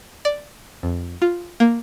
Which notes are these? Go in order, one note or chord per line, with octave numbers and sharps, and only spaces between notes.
D5
F2
F4
A#3